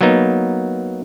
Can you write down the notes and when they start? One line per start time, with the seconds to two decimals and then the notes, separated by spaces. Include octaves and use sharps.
0.01 F#3 A#3 B3 D#4